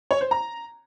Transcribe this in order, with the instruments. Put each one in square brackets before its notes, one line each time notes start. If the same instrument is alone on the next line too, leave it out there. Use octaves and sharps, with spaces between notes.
[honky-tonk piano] C#5
C5
A#5